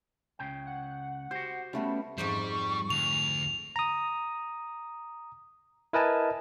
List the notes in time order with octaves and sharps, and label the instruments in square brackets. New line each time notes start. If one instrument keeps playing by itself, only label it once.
[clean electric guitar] C#2 C#3 G5
[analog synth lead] F#5
[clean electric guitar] F#4 C5 [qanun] G4
[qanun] G3 A3 B3 [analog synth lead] C#4
[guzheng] F2 G#2 C5 [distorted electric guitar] G3 [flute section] C#6
[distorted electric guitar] D2 [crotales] F7
[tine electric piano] A#5 D#6
E4 A#4 B4 D#5 G#5 A5